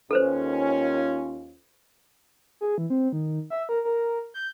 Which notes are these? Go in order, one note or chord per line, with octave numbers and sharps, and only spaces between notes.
D#2 C#4 F4 A4 B4 C5
G#4
E3
C4
D#3
E5
A#4
A#4
G6